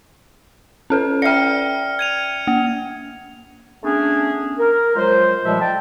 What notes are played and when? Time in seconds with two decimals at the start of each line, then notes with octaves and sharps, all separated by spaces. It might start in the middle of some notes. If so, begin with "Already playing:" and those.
0.90 C#4 A4 B4
1.22 D5 E5 G5 F6 C#7
1.99 G#6 D#7 F7
2.47 A#3
3.83 A3 B3 C#4 D4 G#4
4.58 A#4
4.96 F3 F#3 G#3 C5
5.45 D#2 A#2 F3 G3 G#3 E5
5.60 A4 D#5 G5 A5